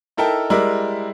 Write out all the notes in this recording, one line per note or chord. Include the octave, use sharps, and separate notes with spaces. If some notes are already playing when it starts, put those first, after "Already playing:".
D#4 E4 A4 A#4 G5 A5
G3 G#3 E4 A#4 D5